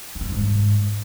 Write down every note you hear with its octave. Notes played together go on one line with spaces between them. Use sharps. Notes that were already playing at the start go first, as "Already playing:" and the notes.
D#3
E2
F2
G#2